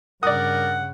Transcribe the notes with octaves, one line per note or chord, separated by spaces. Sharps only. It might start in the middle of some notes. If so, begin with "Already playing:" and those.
G2 C#3 A#4 D5 F#5 D#6